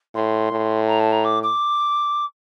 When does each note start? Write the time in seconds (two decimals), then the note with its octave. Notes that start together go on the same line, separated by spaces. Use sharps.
0.14 A2 C6
0.51 A2
0.88 A#5
1.00 A5
1.12 A#5
1.24 D6
1.43 D6